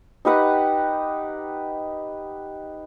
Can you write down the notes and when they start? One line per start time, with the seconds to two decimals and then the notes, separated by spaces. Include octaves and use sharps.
0.25 D#4 G4 B4 F#5